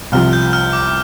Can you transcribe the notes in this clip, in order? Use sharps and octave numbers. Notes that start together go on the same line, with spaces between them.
C2 C3 F3 F6
G6
F6
D6